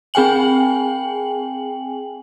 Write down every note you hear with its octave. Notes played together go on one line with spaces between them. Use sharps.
C4 G#4 G5 G#5 F#7